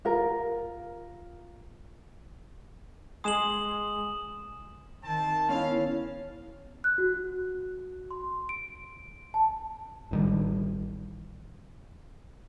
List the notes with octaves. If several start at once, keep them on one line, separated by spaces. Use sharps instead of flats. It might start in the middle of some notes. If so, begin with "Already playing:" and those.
F4 A#4
G#3 G#5 C6 D#6 E7 F#7
D#3 C4 A5
B3 C#4 E4 F5
F#6
F#4
C6
D7
A5
A1 D#3 G3